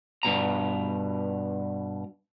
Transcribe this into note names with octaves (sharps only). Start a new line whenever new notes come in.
G2 B2 A#5